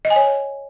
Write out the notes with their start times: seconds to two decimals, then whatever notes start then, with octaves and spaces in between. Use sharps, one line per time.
0.05 D#5
0.10 G#5
0.16 C#5